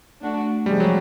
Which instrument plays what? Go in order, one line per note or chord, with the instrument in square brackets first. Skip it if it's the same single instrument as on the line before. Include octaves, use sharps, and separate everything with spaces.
[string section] A3 D4 F#4
[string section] C3 F3 G#3 [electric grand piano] G3
[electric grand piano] F#3